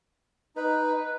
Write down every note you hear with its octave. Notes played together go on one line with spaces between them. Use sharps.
D#4 B4